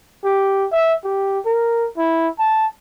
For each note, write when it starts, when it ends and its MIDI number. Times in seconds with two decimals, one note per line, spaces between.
0.24 0.65 67
0.72 0.93 76
1.04 1.39 67
1.45 1.86 70
1.97 2.28 64
2.39 2.66 81